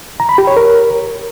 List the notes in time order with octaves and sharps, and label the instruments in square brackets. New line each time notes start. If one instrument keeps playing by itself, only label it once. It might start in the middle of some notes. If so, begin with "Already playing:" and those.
[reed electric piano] A#5
B5
G4
C#5
A#4